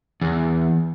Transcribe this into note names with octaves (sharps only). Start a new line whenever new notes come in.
E2